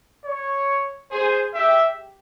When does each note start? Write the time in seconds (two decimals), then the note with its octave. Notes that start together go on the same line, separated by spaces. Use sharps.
0.25 C#5
1.11 G#4 C5
1.54 G4 E5